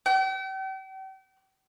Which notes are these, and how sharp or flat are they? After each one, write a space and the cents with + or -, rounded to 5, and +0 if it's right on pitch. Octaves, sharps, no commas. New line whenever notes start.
G5 -40